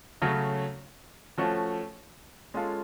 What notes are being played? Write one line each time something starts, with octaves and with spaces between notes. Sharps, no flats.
C#3 F#3 A3 C#4
F3 A3 C#4 F#4
G#3 C#4 F4 A4 F5